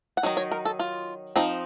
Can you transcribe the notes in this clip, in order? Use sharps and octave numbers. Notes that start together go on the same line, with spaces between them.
F#5
D#3 F#3 D#4
C#5
A#4
A4
F4
F3 C4 D#4